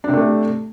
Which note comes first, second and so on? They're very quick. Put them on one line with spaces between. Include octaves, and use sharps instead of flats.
D4 C3 A3